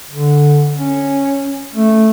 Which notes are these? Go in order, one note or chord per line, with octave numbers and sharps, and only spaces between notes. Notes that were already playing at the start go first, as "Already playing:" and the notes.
D3
C#4
A3